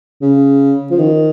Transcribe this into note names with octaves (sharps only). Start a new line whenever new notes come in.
C#3
F3
D#3